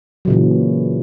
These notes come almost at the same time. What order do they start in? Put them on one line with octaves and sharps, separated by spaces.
F#3 C#3 A#2 E3